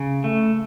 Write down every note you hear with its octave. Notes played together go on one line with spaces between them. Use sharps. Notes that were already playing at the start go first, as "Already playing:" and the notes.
Already playing: C#3
A3